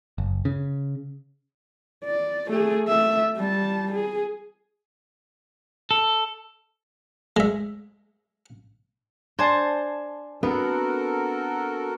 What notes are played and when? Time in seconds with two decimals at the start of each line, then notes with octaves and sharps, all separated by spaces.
0.18 F#1
0.45 C#3
2.05 D5
2.49 A3 G#4
2.88 A3 E5
3.36 G3 A5
3.92 G#4
5.91 A4
7.36 G#3 E5
9.39 D4 C5 G#5 A5
10.43 B3 C4 D4 F#4 A4 A#4